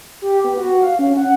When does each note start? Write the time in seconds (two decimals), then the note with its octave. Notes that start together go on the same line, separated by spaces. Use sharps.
0.22 G4
0.44 B3
0.57 F#4
0.83 F5
0.99 C#4
1.17 F#5